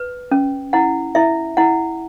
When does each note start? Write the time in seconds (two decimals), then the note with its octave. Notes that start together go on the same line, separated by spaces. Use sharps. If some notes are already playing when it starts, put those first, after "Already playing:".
Already playing: B4
0.31 C#4
0.73 E4 F#5
1.15 E4 E5
1.57 E4 F#5